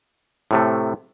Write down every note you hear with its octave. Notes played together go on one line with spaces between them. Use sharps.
A2 C3 A3